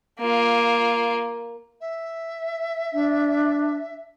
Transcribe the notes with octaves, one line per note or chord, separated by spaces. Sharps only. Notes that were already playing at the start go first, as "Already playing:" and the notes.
A#3 F4
E5
D4